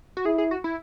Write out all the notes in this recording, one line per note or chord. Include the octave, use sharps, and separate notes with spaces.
F#4
E4 G#4
G#4
F#4
E4